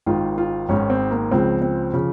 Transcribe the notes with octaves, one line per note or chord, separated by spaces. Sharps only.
G#1 G#2 D#3 F4
F4
G#1 G#2 D#3 C#4
C4
A#3
C#2 C#3 F3 C4
C4
C#3 F3